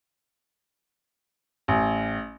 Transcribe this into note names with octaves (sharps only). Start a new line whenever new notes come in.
A1